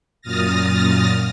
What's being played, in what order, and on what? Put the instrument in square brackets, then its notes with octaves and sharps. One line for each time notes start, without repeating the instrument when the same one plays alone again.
[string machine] F#2 A#2 D#6 F6 A6 A#6